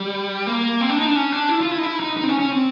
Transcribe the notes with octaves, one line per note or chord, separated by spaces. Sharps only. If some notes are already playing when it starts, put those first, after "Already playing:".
Already playing: G3
A#3
C4
D4
D#4
D4
C#4
D4
E4
F4
E4
D#4
E4
D#4
D#4
C4
C#4
C#4
C4